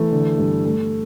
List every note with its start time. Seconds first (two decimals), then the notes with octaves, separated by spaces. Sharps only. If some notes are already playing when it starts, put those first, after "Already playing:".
Already playing: E3 A3
0.12 D3
0.38 G2
0.65 A3